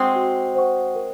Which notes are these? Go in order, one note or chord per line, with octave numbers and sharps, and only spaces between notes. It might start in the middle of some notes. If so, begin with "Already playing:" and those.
Already playing: G#3 C4 F#4 C5 F#5 C#6
F#4
C5 F#5 C#6
A#4